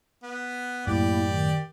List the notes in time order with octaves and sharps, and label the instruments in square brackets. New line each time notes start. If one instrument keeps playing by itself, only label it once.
[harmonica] B3
[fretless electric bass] F#2 A2 [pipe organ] A#3 E4 [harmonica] G4 D5
[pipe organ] D#3